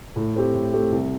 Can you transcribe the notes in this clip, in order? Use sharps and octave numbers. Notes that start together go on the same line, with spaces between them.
A2
A3 C4 G4
A2
A3 C4 G4
C2